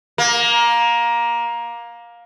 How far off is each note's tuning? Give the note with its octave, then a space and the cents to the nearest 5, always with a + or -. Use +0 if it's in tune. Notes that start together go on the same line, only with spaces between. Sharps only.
A#3 +15